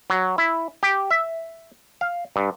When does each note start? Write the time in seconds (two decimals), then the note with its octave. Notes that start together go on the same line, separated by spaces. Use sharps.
0.10 F#3
0.38 E4
0.83 G4
1.11 E5
2.01 F5
2.36 G2